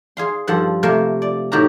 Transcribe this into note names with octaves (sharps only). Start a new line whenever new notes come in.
G#4 F5 C6
G2 F3 A4 F#5
C3 A3 A#3 A#4 F5
D5
A2 D#3 F#4 G4 A#4 A#5